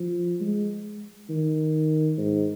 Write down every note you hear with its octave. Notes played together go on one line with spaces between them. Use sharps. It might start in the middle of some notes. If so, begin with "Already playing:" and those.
Already playing: F3
G#3
D#3
G#2